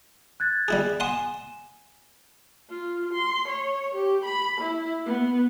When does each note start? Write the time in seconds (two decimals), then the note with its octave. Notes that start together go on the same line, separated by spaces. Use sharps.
0.40 F#6 G#6 A6
0.68 G3 E4 G#4
1.00 F#5 G#5 C6 D#6 E7
2.69 F4
3.13 C6
3.48 C#5
3.94 G4
4.24 B5
4.61 E4
5.06 B3